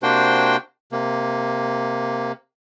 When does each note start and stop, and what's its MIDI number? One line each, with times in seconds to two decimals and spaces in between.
0.03 0.57 48
0.03 0.57 58
0.03 0.57 62
0.03 0.57 66
0.03 0.57 72
0.03 0.57 79
0.92 2.32 48
0.92 2.32 58